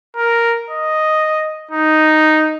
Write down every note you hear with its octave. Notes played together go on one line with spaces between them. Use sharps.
A#4
D#5
D#4